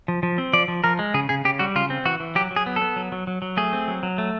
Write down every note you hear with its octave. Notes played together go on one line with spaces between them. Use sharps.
F3
F3
C4
F3 D5
F3
F3 A#4
G#3
C#3 G#4
C#3 G#4
C#3 G4
G3 F#4
C#3 F4
C4
E3 F#4
E3
F#3 G4
F#3
G#4
B3
A4
B3
F#3
F#3
F#3
F#3
A3 G#4
C4
F#3
F#3
A3